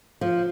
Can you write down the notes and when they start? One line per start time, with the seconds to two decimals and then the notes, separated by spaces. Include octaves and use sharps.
0.21 F3